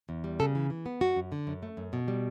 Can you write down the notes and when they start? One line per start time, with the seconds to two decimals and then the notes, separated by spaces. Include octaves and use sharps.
0.09 E2
0.24 G3
0.40 C#3 A4
0.55 E3
0.70 E3
0.86 B3
1.01 F#2 F#4
1.16 F#2
1.32 D3
1.47 F#2
1.63 A3
1.77 F#2
1.93 B2
2.08 G3